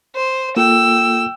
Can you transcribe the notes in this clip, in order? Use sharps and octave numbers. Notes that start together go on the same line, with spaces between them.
C5
A#3 F4 A4 G5 E6